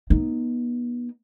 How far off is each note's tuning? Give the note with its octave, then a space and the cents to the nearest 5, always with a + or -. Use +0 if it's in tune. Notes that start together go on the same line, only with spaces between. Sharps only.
B3 -30 D#4 +0